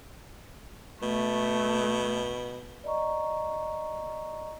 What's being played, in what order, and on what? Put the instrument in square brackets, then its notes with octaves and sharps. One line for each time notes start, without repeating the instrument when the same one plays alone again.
[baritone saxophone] B2 [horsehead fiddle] A3
[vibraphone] D5 D#5 A#5 C#6